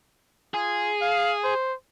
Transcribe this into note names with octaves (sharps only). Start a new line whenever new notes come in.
F4 G#4
F5
C5